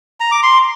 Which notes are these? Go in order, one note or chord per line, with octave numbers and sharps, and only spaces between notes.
A#5
D6
C6